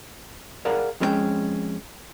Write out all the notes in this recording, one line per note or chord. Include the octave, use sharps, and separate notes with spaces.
G#4 A#4 D5 F5 F#5
F2 G#3 C#4 F4 G5